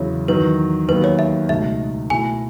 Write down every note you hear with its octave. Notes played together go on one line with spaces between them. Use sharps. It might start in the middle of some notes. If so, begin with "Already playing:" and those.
Already playing: E2 C#3 F#3 B3 E4 C#5
E2 D#3 F#3 B4
D#2 D#3 F#3 B3 B4
C#5
E5
C#2 B2 A3 D#4 E5
B2 A3 E4 G#5